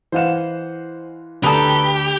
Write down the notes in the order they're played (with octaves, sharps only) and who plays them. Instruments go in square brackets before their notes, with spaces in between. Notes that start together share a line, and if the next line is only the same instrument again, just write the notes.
[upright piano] E3 F5 E7 [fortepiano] C5 D#5 F#5
[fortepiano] D2 [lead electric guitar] G4 [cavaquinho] A4 B4 [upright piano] A#5 D#6 F7